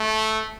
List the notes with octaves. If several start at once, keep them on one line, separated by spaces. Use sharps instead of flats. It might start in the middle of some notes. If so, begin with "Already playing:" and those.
Already playing: A3